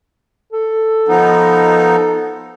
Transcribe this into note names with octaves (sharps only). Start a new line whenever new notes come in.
A4
F3 B3 D#4